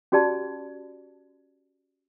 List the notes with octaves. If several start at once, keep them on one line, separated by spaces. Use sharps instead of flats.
C#4 F#4 G4 D5 A5